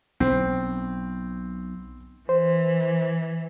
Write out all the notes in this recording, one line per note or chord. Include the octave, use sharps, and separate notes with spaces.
B1 C4
E3 C5